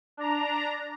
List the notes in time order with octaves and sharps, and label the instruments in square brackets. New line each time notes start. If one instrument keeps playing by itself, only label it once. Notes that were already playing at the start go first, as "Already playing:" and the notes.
[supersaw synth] D4 A#5